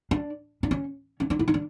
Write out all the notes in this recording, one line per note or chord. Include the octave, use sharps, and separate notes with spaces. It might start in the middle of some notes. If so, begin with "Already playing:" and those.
D4
D4
C#4
C#4
D4
E4
D#4
D4